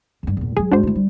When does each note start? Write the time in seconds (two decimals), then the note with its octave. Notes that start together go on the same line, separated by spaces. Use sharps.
0.23 E2 G2
0.37 E2 A#2
0.57 E3 F#3 G#4
0.72 G#2 G#3 D4 F#4 C5
0.83 A3 E4
0.95 G3